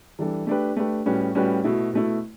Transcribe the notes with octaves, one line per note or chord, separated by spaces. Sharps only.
E3 G3 D4 A4
A3 D4 G4 B4
A3 D4 G4 B4
A2 G3 C#4 F#4 B4
A2 G3 C#4 F#4 B4
B2 A3 E4
B2 A3 E4